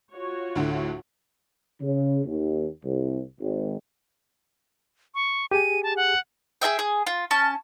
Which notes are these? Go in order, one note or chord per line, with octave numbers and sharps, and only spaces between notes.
F4 F#4 C#5
D2 A2 D3
C#3
D#2
C2
G#1
C#6
G4 G#4 G#5 D#7
A5
F#5
G#4 A4 E5 G5
G#4
F4
C#4 A5